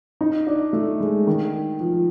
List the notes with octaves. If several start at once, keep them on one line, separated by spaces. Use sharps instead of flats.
D#4
D4
A3
G#3
D#3
F3